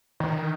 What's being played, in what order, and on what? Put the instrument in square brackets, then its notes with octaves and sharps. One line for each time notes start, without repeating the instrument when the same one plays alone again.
[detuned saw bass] D#3